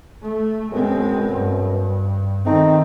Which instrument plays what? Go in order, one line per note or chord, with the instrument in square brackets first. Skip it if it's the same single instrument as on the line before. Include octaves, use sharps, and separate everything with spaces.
[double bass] A3
[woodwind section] F#2 B2 [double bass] G#3 C4
[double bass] G2
[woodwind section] G#2 A3 D#4 [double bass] D#3 C4